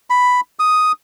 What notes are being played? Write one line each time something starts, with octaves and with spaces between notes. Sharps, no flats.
B5
D#6